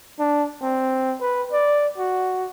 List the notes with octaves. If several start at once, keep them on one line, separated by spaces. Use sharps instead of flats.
D4
C4
B4
D5
F#4